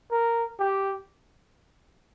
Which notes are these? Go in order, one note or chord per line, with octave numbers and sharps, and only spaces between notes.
A#4
G4